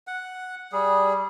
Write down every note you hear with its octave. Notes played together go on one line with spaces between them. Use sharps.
F#5
G3 G#4